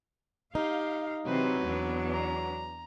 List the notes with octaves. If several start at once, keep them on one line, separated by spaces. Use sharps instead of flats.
D#4 G4 F5
C3 E3 F#3 C4 B4
E2 B3 D4
A#5